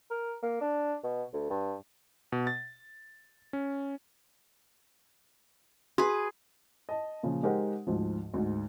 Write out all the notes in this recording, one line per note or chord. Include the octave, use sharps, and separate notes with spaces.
A#4
A#3
D4
B2
D2
G2
B2
A6
C#4
F#4 G#4 B4
D#5 A5
A#2 C#3 F3
G#3 D#4 G4 A#4 C5 F#5
D2 G#2 F3
D2 G#2